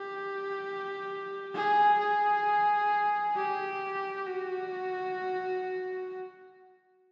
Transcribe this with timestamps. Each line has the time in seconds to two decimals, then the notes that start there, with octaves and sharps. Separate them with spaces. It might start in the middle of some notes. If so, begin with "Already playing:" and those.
Already playing: G4
1.55 G#4
1.99 G#4
3.35 G4
4.26 F#4